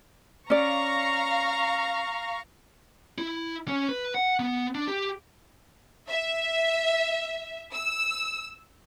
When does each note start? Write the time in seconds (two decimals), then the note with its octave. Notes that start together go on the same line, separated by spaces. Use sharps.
0.50 C#4 D5 F5 A#5 C#6
3.18 E4
3.68 C#4
3.89 B4
4.15 F#5
4.40 B3
4.75 D4
4.88 G4
6.09 E5
7.71 E6